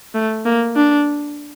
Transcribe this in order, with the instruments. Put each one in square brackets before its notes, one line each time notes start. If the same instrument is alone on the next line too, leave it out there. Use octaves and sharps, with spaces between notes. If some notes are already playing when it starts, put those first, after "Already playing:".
[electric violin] A3
A#3
D4